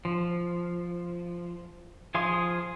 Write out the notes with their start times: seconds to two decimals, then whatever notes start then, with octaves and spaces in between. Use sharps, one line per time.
0.05 F3
2.15 F3 G#4 F5 C6 D#6